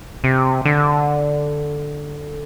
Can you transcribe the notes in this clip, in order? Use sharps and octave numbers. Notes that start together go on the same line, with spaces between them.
C3
D3